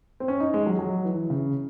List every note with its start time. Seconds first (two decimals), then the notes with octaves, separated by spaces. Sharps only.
0.20 C4
0.28 C#4
0.40 D#4
0.54 G#3
0.67 F#3
0.79 F#3
1.05 E3
1.30 C#3